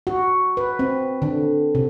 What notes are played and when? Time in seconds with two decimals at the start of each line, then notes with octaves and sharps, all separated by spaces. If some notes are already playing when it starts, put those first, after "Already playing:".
0.07 F#4
0.57 B4
0.79 C4
1.22 D3
1.75 C3